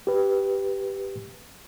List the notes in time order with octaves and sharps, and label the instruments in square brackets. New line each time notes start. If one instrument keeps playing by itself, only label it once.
[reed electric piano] G4 B4